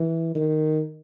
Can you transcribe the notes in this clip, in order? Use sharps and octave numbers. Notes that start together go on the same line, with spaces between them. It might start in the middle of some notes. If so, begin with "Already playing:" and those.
Already playing: E3
D#3